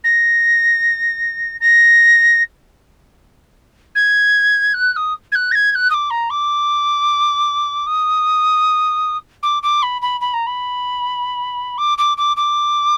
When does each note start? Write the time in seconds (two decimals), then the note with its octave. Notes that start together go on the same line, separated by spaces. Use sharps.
0.04 A#6
1.60 A#6
3.95 G#6
4.74 F#6
4.93 F#6
4.96 D#6
5.32 G#6
5.35 F#6
5.51 A#6
5.55 G#6
5.71 G#6
5.75 F#6
5.90 D#6
5.94 D6
6.10 A#5
6.30 D6
7.86 D#6
9.43 D6
9.63 D6
9.82 B5
10.01 B5
10.21 B5
10.33 A#5
10.46 B5
11.78 D6
11.98 D6
12.17 D6
12.36 D6